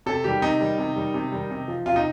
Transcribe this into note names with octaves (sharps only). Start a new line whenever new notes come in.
C3 A4
D#3 G3 G4
C3 D#4
D#3 G3
C3
D#3 G3
C3
D#3 G3
C3
F3
C3 F4
D#4